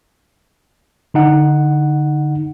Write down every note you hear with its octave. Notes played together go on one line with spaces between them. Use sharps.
D3 D#4 F#5